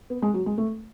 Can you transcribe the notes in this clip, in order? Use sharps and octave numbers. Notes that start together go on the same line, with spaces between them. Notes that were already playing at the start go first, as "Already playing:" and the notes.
B3
G#3
F#3
G#3
A3